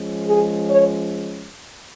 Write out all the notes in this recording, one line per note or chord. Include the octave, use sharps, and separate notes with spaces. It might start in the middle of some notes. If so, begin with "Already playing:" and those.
Already playing: F3 G#3 C#4
G#4
C#5